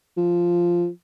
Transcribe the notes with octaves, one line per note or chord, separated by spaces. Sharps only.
F3